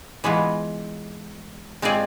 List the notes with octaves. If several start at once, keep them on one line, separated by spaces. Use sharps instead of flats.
E3 G#3 B3 F4
G#3 C4 F4 G#4 D5